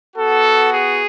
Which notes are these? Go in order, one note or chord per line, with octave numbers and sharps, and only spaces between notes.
B3 F#4 A4
G#4